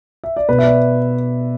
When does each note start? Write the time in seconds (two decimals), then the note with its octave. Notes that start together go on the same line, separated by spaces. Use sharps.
0.24 E5
0.37 D5
0.49 B2 B4
0.59 E5
0.63 B3 D5